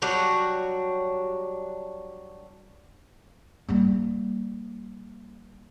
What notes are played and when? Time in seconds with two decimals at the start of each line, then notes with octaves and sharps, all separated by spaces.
0.02 F#3 G3 D4 F#4
3.69 G3 A#3